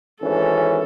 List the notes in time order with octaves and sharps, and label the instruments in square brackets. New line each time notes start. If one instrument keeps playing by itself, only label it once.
[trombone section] G#1 E3 C#4 [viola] A4